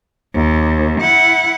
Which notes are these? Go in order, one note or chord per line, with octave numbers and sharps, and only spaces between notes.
D#2
E4 F#5